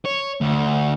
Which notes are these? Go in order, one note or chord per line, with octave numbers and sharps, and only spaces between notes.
C#5
D2